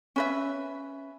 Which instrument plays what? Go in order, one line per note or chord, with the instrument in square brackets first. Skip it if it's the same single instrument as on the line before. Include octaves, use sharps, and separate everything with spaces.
[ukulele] C#4 B4 E5